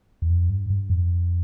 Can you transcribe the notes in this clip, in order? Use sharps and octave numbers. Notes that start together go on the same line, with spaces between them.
E2
F2
G2
G2
F2